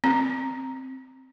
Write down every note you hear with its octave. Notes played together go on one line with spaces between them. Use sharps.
C4